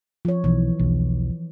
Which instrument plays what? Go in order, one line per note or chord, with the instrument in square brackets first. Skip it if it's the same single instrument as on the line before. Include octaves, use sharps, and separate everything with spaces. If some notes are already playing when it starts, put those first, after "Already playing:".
[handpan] F3 C#5
[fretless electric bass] B1 [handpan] E3
[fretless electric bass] B1 E2